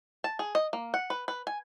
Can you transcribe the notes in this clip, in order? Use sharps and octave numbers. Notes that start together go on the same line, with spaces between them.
A5
G#4
D#5
A#3
F#5
B4
B4
G#5